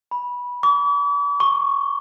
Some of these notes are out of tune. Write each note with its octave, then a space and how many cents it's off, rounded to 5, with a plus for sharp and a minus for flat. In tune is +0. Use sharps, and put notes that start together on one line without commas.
B5 -15
D6 -45
C#6 -10